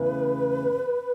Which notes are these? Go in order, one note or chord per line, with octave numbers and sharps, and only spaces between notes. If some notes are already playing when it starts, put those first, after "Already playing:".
Already playing: E2 C#3 A3 E4 B4